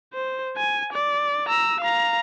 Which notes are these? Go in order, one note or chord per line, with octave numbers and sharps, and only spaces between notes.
C5
G#5
D5
A#5 E6
F5 A#5